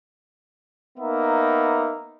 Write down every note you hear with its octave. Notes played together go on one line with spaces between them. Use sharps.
A#3 B3 D#4 E5